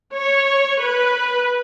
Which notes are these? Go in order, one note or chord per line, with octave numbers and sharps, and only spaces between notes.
C#5
B4